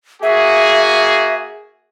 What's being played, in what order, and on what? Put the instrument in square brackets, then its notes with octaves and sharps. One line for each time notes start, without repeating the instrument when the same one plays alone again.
[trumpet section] A#3 F#4 G#4 [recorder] E5